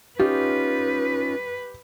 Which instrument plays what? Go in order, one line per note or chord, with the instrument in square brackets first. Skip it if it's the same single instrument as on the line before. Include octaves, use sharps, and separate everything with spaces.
[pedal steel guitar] C#4 D#4 F4 [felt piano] G4 [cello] B4